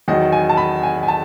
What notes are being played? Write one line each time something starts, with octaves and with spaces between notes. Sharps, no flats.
E2 D#3 F#3 D#5
G#5
A5
B5
G#5
G#5
A5